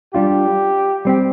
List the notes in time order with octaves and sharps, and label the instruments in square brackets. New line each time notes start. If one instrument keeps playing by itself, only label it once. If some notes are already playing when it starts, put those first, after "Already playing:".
[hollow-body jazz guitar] G3 D4 F4 [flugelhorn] G4
[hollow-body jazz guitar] G3 C4 G4